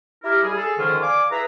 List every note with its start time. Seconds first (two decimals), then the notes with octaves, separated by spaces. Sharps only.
0.24 E4 G4 A#4
0.44 G3 G#4
0.57 G#4 A4
0.78 G#2 D3 D#3 F3 C#4 F4
1.02 D5 F5 G#5 D6
1.31 E4 G#4 B4 E5 A#5